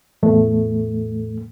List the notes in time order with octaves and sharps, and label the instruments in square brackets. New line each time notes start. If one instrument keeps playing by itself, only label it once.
[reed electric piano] E2 A2 A3